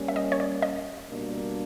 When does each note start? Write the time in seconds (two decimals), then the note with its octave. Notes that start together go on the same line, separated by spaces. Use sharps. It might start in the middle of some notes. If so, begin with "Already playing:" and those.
Already playing: G3 A#3 C#4
0.08 E5
0.16 D#5
0.32 C#5
0.40 D5
0.62 D#5
1.10 B2 G3 A#3 D4